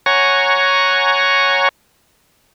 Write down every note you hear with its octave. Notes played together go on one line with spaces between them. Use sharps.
C#5 F#5 G#5 A#5 C#6